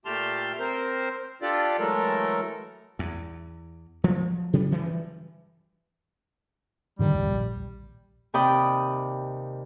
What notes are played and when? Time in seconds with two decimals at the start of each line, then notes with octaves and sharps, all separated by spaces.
0.05 A#2 A3 G4 A5 C6 F6
0.59 C4 A#4 C5
1.42 D4 F4 G4 A4 D5
1.79 E3 F#3 G#3 A3 A4 A#4
2.99 E2
4.04 F3 F#3
4.53 C#3 F#3 G3 B3
4.71 G2 E3 F3 G3
6.99 G#2 D3 D#3 G3
7.12 D#1 G#1
7.30 A#1
8.34 D#2 C3 D5 G5 B5 D#6